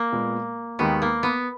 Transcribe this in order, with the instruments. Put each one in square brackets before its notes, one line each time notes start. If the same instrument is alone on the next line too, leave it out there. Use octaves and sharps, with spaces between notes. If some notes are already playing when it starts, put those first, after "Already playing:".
Already playing: [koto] A#3
[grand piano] A#2 G#3 B3
[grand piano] D#2 D#3 G#3 D#4 G4 [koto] B3
[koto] A#3
B3